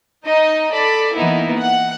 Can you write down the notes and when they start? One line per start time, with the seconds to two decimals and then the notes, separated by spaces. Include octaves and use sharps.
0.25 D#4 D#5
0.71 A4 D5 B5
1.15 E3 A#3 B3 D#4 E4
1.58 F#5